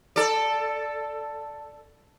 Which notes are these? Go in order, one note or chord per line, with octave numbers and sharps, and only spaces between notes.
A4 D5